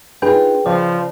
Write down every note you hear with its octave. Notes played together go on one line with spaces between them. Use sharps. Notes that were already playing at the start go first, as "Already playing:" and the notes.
D4 D#4 F4 G#4 B4 G5
C#3 F3 D5 F5